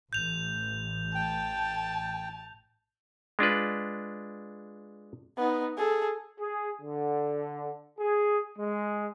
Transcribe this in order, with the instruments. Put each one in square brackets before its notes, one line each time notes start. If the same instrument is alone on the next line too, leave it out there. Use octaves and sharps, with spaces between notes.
[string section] A1 [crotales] G6 F7
[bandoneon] G5 [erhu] A5
[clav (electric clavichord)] G#3 D4 F4 B4
[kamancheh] B3 D#4
G#4 A4
[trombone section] G#4
D3
G#4
G#3